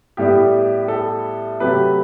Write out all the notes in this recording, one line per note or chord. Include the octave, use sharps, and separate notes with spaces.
A2 G3 B3 G4
A4
C3 F#3 A3 G4 B4